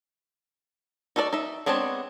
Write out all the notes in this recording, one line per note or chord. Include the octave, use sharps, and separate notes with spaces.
D#4 F#4 A4 A#4 D5
D#4 E5
G#3 B3 C4 D4 C#5